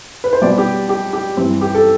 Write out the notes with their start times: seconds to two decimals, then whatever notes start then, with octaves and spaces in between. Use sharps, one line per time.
0.24 B4
0.33 C5
0.42 B2 G3 B3 D5
0.58 G4
0.89 G4
1.13 G4
1.37 G2 E3 G3 C4
1.61 G4
1.74 A4